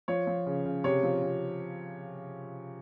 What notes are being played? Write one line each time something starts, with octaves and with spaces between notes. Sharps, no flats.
F3 C#5
F3
C#3
C#3
C3 C#5
F3
C3